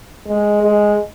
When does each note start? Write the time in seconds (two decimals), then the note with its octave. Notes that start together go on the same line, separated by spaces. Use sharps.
0.27 G#3
0.62 G#3